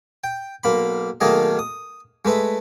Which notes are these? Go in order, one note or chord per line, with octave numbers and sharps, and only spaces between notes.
G5
B1 A#3 B5
B1 D#3 A3 A#3 G#4 D#5
D#6
G#3 A3 B4 E5